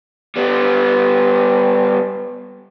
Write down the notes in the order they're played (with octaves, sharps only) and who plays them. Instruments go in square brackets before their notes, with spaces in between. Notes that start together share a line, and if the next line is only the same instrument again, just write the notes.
[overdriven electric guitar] G3 B3